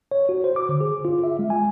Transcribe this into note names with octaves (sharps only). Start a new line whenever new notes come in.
C#5
F#4
C5
D6
D3
G#4
F4
E5
G#3
G#5